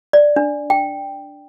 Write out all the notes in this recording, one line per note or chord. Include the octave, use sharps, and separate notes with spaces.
D5
D4
G5